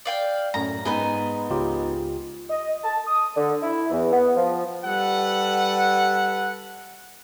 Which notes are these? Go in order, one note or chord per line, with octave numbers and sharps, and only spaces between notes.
D5 F5 G5
F#2 A2 A#5
G#2 B3 D#4 G#5 B5
C#2 F4 G4
D#5
A5
D#6
D3
E4
E2
B3
F3
G3 A4 B4 F#5